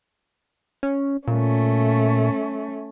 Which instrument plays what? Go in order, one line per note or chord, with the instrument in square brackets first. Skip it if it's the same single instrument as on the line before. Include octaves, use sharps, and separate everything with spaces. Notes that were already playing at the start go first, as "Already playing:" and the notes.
[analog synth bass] C#4
[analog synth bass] A#2 [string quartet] A3 C#4